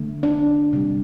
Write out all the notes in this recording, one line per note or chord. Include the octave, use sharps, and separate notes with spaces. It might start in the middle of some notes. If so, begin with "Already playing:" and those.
Already playing: D3 A3
D4
C3 G3